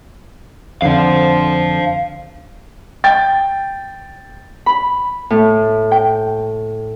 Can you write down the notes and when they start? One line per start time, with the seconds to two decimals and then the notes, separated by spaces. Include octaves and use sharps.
0.82 F2 D3 C5 F5
3.04 G5 A6
4.66 B5
5.30 A2
5.92 G5